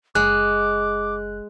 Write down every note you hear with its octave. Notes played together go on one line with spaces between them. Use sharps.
F#1 G#3 D6 F#6